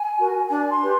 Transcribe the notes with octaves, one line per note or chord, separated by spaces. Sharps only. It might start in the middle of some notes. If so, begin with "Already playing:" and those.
Already playing: G#5
F#4 A#4
D4 G#5
C6
G4 B4